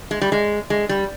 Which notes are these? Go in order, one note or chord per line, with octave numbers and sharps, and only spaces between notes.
G#3
G3
G#3
G#3
G3